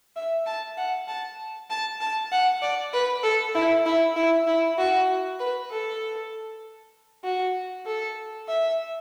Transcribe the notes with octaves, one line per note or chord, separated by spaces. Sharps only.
E5
A5
F#5
A5
A5
A5
F#5
D5
B4
A4
E4
E4
E4
E4
F#4
B4
A4
F#4
A4
E5